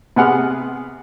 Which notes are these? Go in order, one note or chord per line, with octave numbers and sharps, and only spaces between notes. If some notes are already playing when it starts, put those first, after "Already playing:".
C3 B3 G#4 F#5 F6